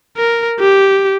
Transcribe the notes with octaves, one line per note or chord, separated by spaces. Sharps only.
A#4
G4